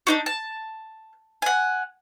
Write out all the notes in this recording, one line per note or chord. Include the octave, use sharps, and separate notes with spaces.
D4 D#4 F#4
A5
F#5 G#5